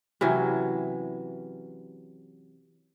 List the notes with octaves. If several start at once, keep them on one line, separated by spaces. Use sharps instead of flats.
C3 E3 F#3 C#4